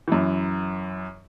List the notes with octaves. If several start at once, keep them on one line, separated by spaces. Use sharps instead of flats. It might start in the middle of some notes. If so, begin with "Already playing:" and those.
F#2 E3